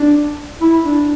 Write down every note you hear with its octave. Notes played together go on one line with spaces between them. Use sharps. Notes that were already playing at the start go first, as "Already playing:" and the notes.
Already playing: D4
E4
D4